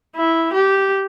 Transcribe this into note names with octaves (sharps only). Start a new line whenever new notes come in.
E4
G4